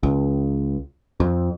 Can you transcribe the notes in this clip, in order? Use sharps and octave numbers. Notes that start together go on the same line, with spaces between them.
C#2
F2